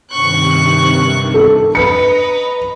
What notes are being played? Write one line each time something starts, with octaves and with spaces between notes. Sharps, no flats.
G2 C3 D#3 C#6 F#6
A4
B4 D#5 A#5 C#7